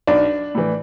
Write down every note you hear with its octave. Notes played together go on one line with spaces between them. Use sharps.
B1 D4 D5
A2 E3